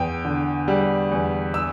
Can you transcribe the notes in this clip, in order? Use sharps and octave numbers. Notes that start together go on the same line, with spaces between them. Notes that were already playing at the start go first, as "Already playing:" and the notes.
Already playing: E2 G5
D3
G3
E2
E6